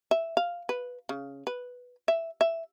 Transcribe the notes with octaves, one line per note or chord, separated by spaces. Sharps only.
E5
F5
B4
C#3
B4
E5
E5